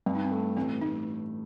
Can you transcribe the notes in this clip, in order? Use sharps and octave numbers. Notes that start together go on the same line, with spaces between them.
G2 C4
D#4
C4
A3
A1 C4
A1 D#4